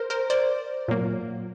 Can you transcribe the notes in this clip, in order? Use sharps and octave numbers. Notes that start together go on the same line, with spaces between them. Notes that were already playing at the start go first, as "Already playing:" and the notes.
Already playing: A#4 C5
A#4 C5
C5 D5
A#2 F#3 A#3